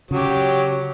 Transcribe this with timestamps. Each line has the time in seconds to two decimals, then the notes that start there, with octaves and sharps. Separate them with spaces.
0.11 C#3 F#3 G4 C#5